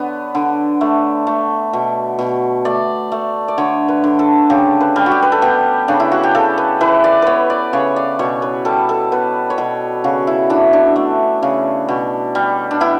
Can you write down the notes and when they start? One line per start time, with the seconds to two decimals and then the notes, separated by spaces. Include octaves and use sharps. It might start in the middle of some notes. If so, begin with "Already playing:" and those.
Already playing: D3 B3 C#5
0.35 D3
0.81 A3
1.27 A3
1.73 B2
2.19 B2
2.65 A3 D5
3.12 A3
3.48 D5
3.58 D3 C#5
3.88 B4
4.04 D3
4.19 A4
4.50 C#3 G4
4.81 B4
4.96 G3
5.06 F#4
5.12 G4
5.22 B4
5.32 A4
5.42 B3 G4
5.88 C#3 D4
6.00 E4
6.12 F#4
6.24 G4
6.35 C#3 A4
6.58 B4
6.81 E3 B4
7.04 D5
7.22 B3 B4 C#5
7.50 D5
7.73 C#3 C#5
7.96 D5
8.19 B2 C#5
8.42 B4
8.65 G3 A4
8.89 A4
9.12 B3 B4
9.50 C#5
9.58 B2 B4
10.04 C#3 F#4
10.27 E4
10.50 E3 D4
10.73 D4
10.96 A3
11.43 C#3
11.89 B2
12.35 G3
12.71 D4
12.80 B3 E4